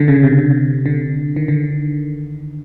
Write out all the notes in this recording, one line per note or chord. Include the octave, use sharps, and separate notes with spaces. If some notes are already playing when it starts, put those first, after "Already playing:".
Already playing: D3
C#3
C3
D3
D#3
D3